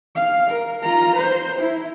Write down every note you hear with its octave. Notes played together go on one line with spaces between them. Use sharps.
F5
A#4
F4 A#5
C5
E4